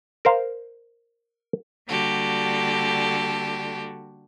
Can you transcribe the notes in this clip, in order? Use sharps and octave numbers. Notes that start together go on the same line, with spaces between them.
A#4 C5 F5
D3 G3 A#3 F#4 G4 A4